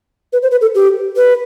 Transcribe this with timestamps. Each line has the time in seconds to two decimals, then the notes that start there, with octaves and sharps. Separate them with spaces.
0.33 B4
0.42 C5
0.51 B4
0.61 A4
0.75 G4
1.17 B4